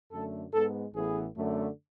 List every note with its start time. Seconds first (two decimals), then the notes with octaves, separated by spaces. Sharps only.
0.12 F#2 D3 A3 A4
0.52 G#2 G#3 B3 A4
0.93 A1 A2 E3 B3 G#4
1.35 F#2 D3 A3